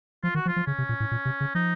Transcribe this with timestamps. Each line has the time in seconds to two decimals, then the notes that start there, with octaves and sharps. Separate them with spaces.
0.23 F3 F4
0.34 D#3 F#4
0.45 F3
0.48 F4
0.56 F3
0.67 C#3 C#4
0.78 C3
0.89 A#2
1.00 A2
1.11 A#2
1.25 C3
1.40 C#3
1.55 F3 D#4